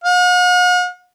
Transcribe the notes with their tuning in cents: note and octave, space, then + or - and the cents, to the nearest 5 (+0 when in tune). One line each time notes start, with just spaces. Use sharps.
F#5 -45